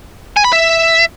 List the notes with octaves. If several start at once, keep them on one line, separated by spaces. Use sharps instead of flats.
G#5
B5
E5